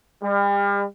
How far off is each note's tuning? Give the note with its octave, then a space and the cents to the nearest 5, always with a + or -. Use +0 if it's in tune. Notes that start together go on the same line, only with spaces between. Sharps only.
G3 +40